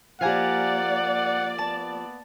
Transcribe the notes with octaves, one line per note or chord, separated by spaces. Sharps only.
F3 A#3 G4 D5 F5 F#5 G#5 A#5
B3 A5